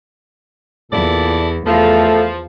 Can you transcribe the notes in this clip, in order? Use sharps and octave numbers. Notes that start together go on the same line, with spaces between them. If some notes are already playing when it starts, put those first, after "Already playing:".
E2 A#2 E4 A4 D5
E2 F3 A3 A4 F5